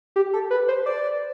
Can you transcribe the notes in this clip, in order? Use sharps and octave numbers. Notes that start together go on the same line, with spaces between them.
G4
A4
B4
C5
D5